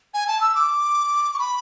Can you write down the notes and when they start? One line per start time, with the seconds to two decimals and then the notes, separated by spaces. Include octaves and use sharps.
0.14 G#5
0.27 A5
0.41 E6
0.55 D6
1.34 C#6
1.39 B5